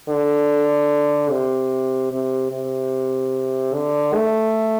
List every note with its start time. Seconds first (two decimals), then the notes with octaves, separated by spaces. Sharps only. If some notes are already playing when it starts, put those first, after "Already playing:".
0.08 D3
1.30 C3
2.11 C3
2.52 C3
3.74 D3
4.14 A3